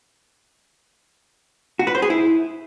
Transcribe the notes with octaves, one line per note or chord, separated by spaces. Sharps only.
F#4
B4
C5
G#4
E4